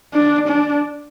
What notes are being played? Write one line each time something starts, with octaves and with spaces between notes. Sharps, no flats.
D4
D4